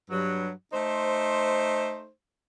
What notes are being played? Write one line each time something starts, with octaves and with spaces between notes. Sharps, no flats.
G2 F#3
A3 D#4 C5